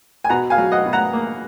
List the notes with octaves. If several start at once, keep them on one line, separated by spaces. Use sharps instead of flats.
G#5
B2 F#5 A#5
F5 G#5
F#3
D#5 F#5
B2
F#5 A#5
A#3